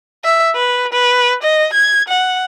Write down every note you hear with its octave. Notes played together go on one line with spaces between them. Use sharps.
E5
B4
B4
D#5
G#6
F#5